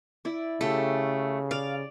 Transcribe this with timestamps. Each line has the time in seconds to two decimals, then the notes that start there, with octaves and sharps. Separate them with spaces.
0.25 E4 D5
0.61 C#3 A3 G4 A4
1.51 D5 F5